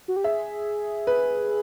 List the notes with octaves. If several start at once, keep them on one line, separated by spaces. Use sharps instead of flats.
F#4
G4
G#4 E5
B4